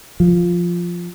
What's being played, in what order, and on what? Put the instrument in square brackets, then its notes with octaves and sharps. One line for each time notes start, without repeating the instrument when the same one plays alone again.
[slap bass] F3